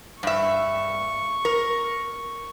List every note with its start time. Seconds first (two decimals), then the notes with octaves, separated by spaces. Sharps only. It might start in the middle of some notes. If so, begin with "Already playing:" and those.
0.23 G2 E5 C#6
1.45 A#4